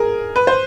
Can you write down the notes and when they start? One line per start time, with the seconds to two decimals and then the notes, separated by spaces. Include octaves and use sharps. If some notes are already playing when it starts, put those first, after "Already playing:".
Already playing: G#4 A#4
0.36 B4
0.47 C5